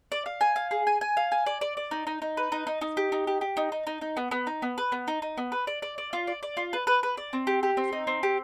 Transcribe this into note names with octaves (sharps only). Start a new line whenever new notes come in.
D5
F5
G#5
F5
G#4
G#5
G#5
F5
G#5
D5
D5
D5
D#4
D#4
D#4
B4
D#4
D#4
D#4
G4
D#4
G4
G4
D#4
D#4
D#4
D#4
B3
B3
D#4
B3
B4
B3
D#4
D#4
B3
B4
D5
D5
D5
F4
D5
D5
F4
B4
B4
B4
D5
C4
G4
G4
C4
D#4
C4
G4